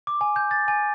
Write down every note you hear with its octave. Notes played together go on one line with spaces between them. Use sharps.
D6
G#5
G6
A6
G#5